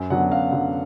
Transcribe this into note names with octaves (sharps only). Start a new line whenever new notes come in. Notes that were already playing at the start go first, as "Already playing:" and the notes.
Already playing: F#2
D3 F#3 B3 F#5
F#2 F5
D3 F#3 B3